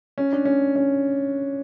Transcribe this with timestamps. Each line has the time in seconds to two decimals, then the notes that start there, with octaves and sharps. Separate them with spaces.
0.18 C#4
0.33 D4
0.45 C#4
0.76 C#4